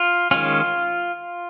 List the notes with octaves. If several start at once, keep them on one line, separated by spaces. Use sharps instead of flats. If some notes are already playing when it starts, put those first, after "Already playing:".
Already playing: F4
D#3 G#3 C#4 F4